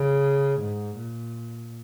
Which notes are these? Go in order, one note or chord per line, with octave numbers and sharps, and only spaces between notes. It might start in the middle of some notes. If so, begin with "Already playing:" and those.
Already playing: C#3
G#2
A#2